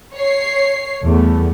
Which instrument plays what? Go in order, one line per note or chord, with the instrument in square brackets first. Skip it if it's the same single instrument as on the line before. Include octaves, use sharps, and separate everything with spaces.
[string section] C#5 C7
[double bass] E2 [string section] G3 A3 B3